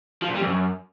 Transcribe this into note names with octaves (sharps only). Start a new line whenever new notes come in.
F3
A#2
G3
F2
F#2